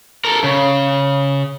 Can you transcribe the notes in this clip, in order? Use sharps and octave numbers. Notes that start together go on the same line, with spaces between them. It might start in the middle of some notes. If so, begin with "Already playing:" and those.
A4 A#4
C#3